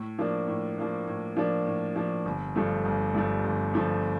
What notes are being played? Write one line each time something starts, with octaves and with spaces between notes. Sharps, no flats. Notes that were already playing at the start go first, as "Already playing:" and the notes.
Already playing: A2
F3 A#3 D4
A2
F3 A#3 D4
A2
F3 A#3 D4
A2
F3 A#3 D4
G1
G2 F3 A3
G1
G2 F3 A3
G1
G2 F3 A3